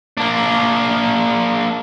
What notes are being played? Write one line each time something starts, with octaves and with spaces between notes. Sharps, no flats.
A#3 D4